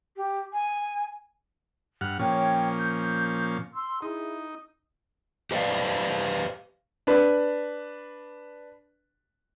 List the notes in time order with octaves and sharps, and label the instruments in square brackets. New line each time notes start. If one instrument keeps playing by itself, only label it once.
[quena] G4
G#5
[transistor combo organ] G2 F#5 F6
[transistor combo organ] A#2 F3 C#4 [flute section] C#5 G5
[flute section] G6
C6 E6
[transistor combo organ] D#4 [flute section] E4 G#4
[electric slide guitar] G4 B4 C5 D5 F5
[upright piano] D4 B4